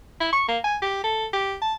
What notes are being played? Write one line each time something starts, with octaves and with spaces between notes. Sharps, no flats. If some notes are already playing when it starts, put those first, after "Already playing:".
E4
C#6
A#3
G#5
G4
A4
G4
A5